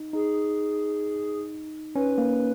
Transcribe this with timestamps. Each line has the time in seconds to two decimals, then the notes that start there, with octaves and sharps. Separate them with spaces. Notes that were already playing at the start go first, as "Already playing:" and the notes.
Already playing: D#4
0.13 D#4 G#4
1.95 C#4 B4
2.18 A#3